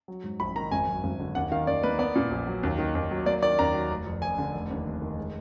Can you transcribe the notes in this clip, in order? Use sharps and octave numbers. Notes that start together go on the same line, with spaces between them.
F#3
G#2
A#1 B5
D#3 A#5
G#1 G#5
F#2
G#1
D3
D#2 F#5
D#3 F5
D#2 D5
A#3 B4
B3 D5
A#2
A#1
F#3
D#2
D#3
D#2
F#3
A#3 D5
D#3 D5
D#2 A#5
F#3
F1
F2
F1 G#5
D3
F1
D#2
F1
D#3
G#3